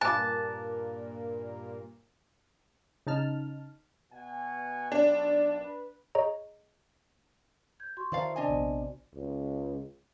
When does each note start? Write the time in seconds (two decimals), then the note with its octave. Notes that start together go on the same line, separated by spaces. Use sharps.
0.01 G2 A#2 A#3 G#5 A5 D6 F#6
3.07 C#3 D#4 A5 F6
4.12 B2 F#5 G#5
4.92 B1 D4 D5
5.61 B4
6.15 G#4 C#5 D#5 A#5
7.80 G6 G#6
7.97 F#4 C6 C#6
8.12 D#3 E4 C5 D5 F5 A5 A#5
8.36 C3 D4 D5 D#5 G#5
8.49 A#1 B3 C4
9.14 C#2